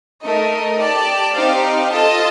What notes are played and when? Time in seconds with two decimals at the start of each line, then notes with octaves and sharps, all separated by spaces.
0.24 A3 D#4 A#4 D#5
0.79 G4 D5 A5
1.35 C4 D#4 G4 C5 F5
1.91 F4 A4 D#5 A5